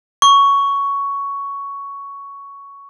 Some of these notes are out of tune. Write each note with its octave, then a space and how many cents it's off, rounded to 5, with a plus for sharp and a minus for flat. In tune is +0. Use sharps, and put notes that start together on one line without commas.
C#6 +10